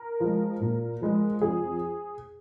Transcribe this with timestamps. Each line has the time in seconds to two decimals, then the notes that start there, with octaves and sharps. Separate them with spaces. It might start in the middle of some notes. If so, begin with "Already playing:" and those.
Already playing: A#4
0.20 F3 G#3
0.60 A#2
1.01 F3 G#3
1.41 F2 G#4